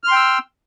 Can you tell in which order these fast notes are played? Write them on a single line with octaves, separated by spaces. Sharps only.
F6 C6 G5 E6